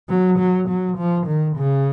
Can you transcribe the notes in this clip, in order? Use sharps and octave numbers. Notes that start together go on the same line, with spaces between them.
F#3
F#3
F#3
F3
D#3
C#3